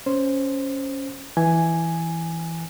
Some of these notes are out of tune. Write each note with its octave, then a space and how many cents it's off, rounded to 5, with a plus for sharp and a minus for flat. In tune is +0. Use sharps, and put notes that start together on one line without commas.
C#4 +0 C5 +0
E3 +0 G#5 +0